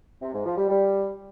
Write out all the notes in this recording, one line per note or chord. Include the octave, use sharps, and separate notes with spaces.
C3
G#2
F3
G3
G3